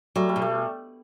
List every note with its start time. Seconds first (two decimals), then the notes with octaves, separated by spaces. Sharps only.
0.16 F#3 G3 A3
0.29 G3 A3
0.36 B2
0.42 G3 A3